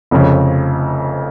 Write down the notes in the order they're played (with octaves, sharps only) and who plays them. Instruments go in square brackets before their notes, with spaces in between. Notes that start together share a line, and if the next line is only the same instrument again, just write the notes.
[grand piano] F1 F2 C#3